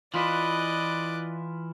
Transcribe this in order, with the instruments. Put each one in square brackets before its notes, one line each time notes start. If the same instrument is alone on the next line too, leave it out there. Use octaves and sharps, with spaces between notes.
[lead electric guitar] E3 E4 [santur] F4 [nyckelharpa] B4 D#5 [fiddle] D5 F#6